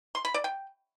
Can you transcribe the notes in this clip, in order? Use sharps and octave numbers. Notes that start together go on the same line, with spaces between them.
C6
B5
D5
G5